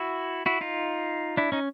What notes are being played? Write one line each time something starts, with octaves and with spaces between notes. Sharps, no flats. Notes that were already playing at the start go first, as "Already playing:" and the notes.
Already playing: E4 F#4
E4 F#4
D#4 F4
D4 E4
C#4 D#4